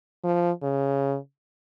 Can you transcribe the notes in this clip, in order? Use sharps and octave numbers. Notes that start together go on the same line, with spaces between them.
F3
C#3